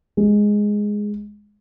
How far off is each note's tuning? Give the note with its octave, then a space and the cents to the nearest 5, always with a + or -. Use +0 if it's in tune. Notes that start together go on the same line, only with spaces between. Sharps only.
G#3 +0